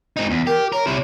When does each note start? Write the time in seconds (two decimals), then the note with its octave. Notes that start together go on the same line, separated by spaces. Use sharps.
0.17 C4 D#4
0.31 E2
0.47 G4 A#4
0.72 A#4 C#5
0.87 C3 E4